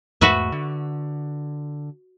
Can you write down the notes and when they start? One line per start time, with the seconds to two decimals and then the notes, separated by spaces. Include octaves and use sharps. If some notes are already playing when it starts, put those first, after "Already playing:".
0.21 E2 G#2 A3 F#4 B4 E5
0.52 D3